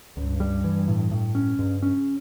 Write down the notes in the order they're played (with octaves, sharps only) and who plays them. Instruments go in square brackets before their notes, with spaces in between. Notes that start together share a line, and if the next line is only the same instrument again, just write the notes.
[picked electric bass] C#2 [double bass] G2
[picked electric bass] G3
E3
A2
A2
C#4
[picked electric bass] G2 [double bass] C#3
[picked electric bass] C#4